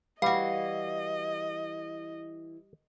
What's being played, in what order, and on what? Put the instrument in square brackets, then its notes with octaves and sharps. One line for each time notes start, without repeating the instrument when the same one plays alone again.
[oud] E3 F#4 [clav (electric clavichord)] G3 [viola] D#5 [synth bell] F5 C7